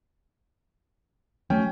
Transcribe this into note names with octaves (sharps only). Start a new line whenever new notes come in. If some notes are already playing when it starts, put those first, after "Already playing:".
F#3 A3 C#4 G5